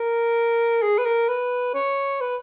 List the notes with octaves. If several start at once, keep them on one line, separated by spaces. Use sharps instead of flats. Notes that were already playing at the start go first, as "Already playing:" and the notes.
Already playing: A#4
G#4
B4
A#4
B4
C#5
B4